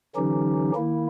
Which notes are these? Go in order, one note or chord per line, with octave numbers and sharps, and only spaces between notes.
D3 E3 F#3 C#4 D#4 G4
D#3 A#3 E4